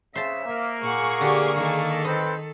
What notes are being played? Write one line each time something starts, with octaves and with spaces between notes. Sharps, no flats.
C#3 C5 E5 A5
A#3
A#2 G#4 F#5 C#6
D3 G4 A5
D#3 A4
C4 B4 C5 D#5